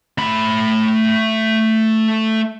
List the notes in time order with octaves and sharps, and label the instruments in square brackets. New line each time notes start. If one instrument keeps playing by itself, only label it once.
[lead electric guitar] A3 B5